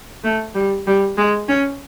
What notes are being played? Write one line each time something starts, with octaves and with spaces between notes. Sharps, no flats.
A3
G3
G3
G#3
C#4